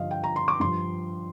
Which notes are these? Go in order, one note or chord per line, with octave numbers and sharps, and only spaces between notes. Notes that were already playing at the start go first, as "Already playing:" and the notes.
Already playing: G2 D3 F3 D#5 F5
G5
A#5
C6
D6
G2 F3 C6